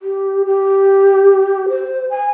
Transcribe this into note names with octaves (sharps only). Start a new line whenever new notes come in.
G4
G4
C5
G#5